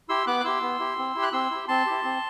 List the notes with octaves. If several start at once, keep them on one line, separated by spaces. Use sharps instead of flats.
E4 G4 C6 E6
B3 D6 F#6
F#6
E4 G4 C6 E6
B3
E4 G4
C4
E4 G4
F#6
C4 C6 E6
E4 G4
C4 A5 C6
E4 G4
C4